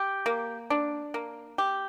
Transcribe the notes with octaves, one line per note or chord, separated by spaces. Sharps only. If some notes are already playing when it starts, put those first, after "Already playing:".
Already playing: G4
A#3
D4
A#3
G4